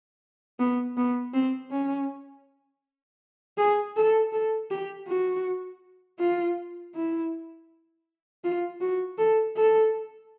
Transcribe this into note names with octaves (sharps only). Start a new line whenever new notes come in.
B3
B3
C4
C#4
G#4
A4
A4
G4
F#4
F4
E4
F4
F#4
A4
A4